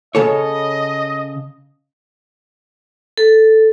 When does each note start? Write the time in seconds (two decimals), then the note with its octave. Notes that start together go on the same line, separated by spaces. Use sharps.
0.15 C#3 A4 C#5 D#5
3.17 A4